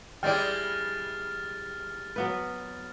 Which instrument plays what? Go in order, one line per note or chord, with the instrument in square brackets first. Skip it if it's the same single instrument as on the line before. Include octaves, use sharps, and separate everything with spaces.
[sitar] G3 G#3 E4 [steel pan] D5 D#5 G5 [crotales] F6 A6
[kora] F#3 B3 B4